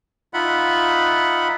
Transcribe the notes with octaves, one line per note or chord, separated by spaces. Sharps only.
D#4 F4 E5 F#5 B5